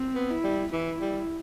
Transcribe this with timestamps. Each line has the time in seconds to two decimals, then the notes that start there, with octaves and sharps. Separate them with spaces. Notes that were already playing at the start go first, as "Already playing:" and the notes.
Already playing: C4
0.15 B3
0.30 E4
0.44 G3
0.73 E3 E4
1.01 G3